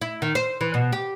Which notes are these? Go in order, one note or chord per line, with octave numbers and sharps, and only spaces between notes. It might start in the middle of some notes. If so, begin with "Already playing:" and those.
E4
D#3
C5
E3
B2
G4